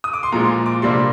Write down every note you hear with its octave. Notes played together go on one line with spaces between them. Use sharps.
D#6
D6
C6
A#2 F3 G#3 A#5
D6
C3 G3 A#3 D4 C6